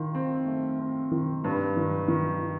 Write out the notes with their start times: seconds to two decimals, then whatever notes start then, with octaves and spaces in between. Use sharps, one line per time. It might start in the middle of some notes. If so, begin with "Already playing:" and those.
Already playing: D#3 F4
0.15 C4
0.46 A3
0.79 C4
1.12 D#3
1.44 G2
1.77 D#3
2.08 D#3